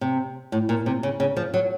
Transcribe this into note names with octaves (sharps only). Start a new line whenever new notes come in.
C3
A2
A#2
C3
C#3
C#3
F3
F#3